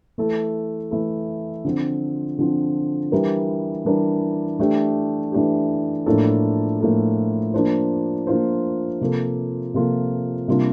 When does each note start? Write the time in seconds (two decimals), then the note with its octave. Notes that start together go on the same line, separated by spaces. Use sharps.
0.18 E3 A3 E4 A4
0.91 E3 A3 E4 A4
1.65 D3 F3 C4
2.39 D3 F3 C4
3.12 E3 G3 D4 G4 A#4
3.85 E3 G3 D4 G4 A#4
4.59 E3 A3 D4 G4
5.32 E3 A3 D4 G4
6.06 A2 F3 A#3 D4 A4
6.80 A2 F3 A#3 D4 A4
7.54 F3 A#3 D4 F4 C5
8.27 F3 A#3 D4 F4 C5
9.01 C3 F3 A#3 F4 A4
9.74 C3 F3 A#3 F4 A4
10.48 C3 G3 A#3 D4 F4